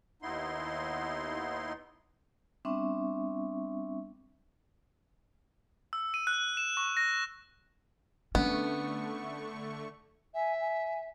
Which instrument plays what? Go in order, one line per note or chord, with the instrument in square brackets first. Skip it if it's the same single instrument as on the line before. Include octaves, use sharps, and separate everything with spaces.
[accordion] D#2 B3 D#4 E4 C6
[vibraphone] G3 B3 C4 D4 E5 C#6
[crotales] E6
D#7
F#6
E7
C#6
A#6
[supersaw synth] D3 A3 C#6 [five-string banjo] B3 [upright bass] C#4 D4
[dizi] E5 [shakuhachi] G#5
[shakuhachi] G#5